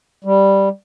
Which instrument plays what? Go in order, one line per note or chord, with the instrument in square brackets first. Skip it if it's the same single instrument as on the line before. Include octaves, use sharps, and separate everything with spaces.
[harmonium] G3